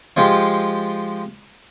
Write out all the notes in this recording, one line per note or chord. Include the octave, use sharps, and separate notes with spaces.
F3 G#3 F4 G4